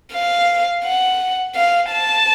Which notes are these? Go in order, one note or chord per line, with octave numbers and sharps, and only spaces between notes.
F5
F#5
F5
A5